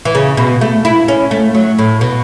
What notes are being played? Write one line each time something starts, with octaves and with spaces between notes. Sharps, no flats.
E3
C#3
B2
A3
E4
C#4
A3
F#3
A2
B2